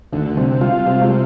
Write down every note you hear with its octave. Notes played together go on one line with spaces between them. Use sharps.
D2 D#3
C3 G3
G3 F4
C3 G3
G#3
G3